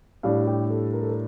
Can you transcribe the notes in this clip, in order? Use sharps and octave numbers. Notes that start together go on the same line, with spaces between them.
A2 G3 D4 F5
G4
A4
A#4
A4
A#4